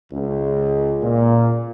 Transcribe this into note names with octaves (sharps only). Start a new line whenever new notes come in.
C#2
A#2